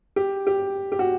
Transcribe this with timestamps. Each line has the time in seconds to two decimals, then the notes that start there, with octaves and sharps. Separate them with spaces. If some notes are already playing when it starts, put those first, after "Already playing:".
0.16 G4
0.47 G4
0.92 G4
0.99 F#4